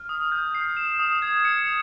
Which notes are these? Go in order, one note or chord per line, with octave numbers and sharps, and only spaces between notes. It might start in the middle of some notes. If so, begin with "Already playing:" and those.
Already playing: F6
D#6
G6
C7
E7
D#6
G#6
C#7
F7